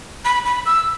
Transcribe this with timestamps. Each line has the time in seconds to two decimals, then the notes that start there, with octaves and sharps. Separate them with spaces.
0.25 B5
0.46 B5
0.66 E6